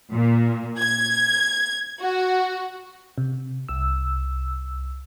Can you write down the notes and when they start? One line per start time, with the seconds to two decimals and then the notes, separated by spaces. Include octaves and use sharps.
0.13 A#2
0.79 G#6
2.02 F#4
3.18 C3
3.69 C2 E6